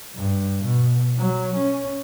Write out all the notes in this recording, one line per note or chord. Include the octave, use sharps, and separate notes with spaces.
G2
B2
F#3
C#4